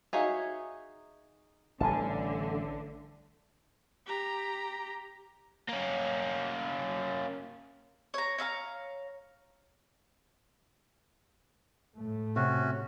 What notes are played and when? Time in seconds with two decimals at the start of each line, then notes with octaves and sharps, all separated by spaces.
0.13 D#4 F#4 G#4 C#5 E5 F5
1.81 A1 D3 G3 G#5 A5
4.06 G4 A#5
5.69 A#3 C#4
8.14 C#5 A#5
8.38 C#5 E5 F5 A#5
11.96 A2 A3
12.36 C3 C#4 F#4